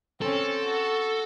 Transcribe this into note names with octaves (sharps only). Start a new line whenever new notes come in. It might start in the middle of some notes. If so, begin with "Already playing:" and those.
C4 C#4 A4
F#4